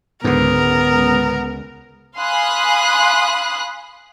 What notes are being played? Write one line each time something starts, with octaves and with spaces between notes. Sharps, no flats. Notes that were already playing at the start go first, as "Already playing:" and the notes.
C#2 G#2 D3 B3 A#4
F5 G#5 B5 C6 D#6 F#6